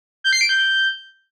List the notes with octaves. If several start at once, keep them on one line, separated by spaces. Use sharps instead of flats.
G6
C7
D7
G6